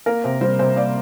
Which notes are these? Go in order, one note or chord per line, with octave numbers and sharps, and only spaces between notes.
A#3 A#4
C3 C5
G3 C5
C3 C5
A#3 D5